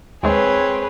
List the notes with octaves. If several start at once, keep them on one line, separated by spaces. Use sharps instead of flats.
D#2 G#3 C4 G#4 B4 C#5